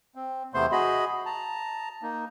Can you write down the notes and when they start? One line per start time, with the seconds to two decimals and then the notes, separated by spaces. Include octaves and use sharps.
0.15 C4
0.54 E2 C3 A3 B3 C5 C6
0.72 F#4 G#4 D#5 B5
1.26 A5 A#5
2.02 A#3 D#4